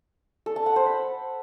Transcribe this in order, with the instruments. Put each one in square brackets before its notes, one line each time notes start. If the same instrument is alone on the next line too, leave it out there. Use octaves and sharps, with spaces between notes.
[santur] A4
A5
F#5
C5
B5